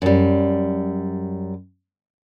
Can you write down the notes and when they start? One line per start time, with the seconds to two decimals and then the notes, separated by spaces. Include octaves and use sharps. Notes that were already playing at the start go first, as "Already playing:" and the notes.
0.02 F#2 G3